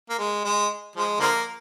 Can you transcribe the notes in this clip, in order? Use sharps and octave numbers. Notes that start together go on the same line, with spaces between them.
A#3
G#3
G#3
F3 G#3
D3 F3 A#3